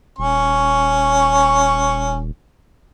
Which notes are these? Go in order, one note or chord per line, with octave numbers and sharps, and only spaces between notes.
D#1 C#4 C#6